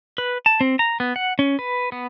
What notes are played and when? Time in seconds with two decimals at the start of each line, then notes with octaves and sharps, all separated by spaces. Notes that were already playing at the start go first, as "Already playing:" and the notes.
0.18 B4
0.46 A5
0.61 C4
0.79 A#5
1.00 B3
1.16 F#5
1.39 C#4
1.59 B4
1.92 B3